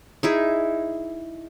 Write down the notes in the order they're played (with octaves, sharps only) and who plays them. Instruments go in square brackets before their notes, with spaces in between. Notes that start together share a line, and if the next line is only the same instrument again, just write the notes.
[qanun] D#4 E4 G#4